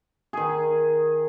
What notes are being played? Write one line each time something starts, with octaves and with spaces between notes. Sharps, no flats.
D#3 G#4